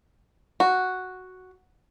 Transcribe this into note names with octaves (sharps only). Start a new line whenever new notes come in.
F#4